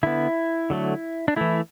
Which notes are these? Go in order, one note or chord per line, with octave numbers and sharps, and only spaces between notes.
D3 B3 E4
D3 F#3 A3
D4
E3 A3 E4